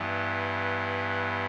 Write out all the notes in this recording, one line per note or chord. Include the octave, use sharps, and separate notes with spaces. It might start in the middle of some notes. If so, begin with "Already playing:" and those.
Already playing: G2 E3 B3